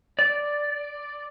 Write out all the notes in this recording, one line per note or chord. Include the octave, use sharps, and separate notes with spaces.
D5